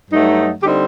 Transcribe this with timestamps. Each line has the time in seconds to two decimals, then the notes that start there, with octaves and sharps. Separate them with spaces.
0.10 G2 F#3 A3 D#4
0.63 D3 G3 C4 D#4 G4